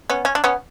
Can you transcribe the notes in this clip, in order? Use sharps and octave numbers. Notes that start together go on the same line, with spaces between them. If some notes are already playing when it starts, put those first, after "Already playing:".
B3 C#4
C#4
D4
B3 C#4